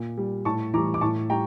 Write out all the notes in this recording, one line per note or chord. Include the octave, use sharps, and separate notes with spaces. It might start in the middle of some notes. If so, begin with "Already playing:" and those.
Already playing: A#2
G3
A2 A5 C#6
E3 G3 A#5 D6
D6
A2 A5 C#6
G3 G5 A#5